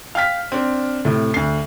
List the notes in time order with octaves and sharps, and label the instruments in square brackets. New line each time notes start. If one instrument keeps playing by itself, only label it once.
[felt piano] F5 G5 F6 B6
C4 D4
A2 C3
D2 C7